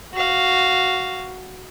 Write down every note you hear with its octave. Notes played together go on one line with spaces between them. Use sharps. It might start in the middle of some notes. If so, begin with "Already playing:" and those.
F#4 F5